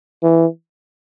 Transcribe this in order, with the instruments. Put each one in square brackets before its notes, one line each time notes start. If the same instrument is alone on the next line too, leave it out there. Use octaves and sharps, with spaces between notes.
[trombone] E3